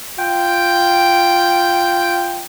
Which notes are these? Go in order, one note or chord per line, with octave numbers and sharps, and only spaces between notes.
F4 G5